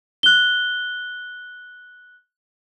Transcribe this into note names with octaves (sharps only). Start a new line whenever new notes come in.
F#6 G7